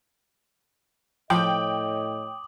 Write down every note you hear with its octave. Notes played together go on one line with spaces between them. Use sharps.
A2 F3 C#5 D#5 G5 D6 D#6 F#7